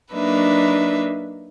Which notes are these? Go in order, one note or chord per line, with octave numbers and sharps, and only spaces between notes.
F#3 A#3 D4 D#4 B4 E5